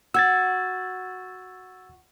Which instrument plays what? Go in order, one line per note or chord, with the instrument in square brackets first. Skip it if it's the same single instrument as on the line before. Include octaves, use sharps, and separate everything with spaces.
[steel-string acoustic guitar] F#4 [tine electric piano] E6 G#6 A6